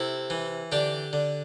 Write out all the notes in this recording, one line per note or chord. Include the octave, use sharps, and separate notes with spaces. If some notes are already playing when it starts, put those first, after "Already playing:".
Already playing: C3 E4 A4
E3
D3 D4 G4
D3